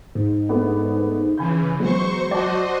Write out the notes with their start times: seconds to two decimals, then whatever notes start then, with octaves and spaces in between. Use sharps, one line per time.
0.15 G#2
0.49 A3 B3 D4
1.38 C#3 E3 G#5 B5 G6
1.80 F#3 G#3 B3 C5 C#6
2.31 F#4 C5 D5 D#5 A5